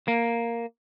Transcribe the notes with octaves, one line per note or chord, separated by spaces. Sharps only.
A#3